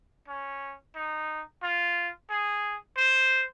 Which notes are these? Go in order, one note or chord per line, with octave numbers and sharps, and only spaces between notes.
C#4
D#4
F4
G#4
C5